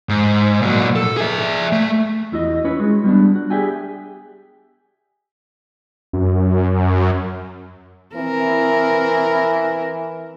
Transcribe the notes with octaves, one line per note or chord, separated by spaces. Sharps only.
G#2
A#2 F#3
A4
G#4 E5
A3
E2 E4 F#4 D#5
C#4 E4 B4 C#5
G#3 F#4 G#4
G3 B3 D4
F#4
G4 G#4 D5 E5 G5 G#5
F#2
E3 C4 E4 A#4